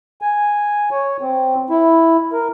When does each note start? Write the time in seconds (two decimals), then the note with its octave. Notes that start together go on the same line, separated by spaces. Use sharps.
0.22 G#5
0.91 C#5
1.21 C4
1.70 E4
2.33 A#4